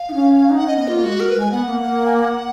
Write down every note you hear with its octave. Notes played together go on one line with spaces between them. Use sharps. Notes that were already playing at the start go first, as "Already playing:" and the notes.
Already playing: F5
D#4
C#4
D#4
F#5
C#4 D#5
B3 D#5
A#3 F4
G#3 F#4
A#4
B4
G#3 G#5
B3 F#5
A#3
A#3
G#5
F#5